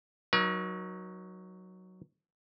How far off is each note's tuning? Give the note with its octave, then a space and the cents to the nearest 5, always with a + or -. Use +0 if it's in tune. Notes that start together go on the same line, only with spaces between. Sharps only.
F#3 +0 D#4 +0 A#4 +45